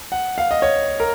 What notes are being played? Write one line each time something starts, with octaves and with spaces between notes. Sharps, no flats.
F#5
F5
D#5
C#5
A#4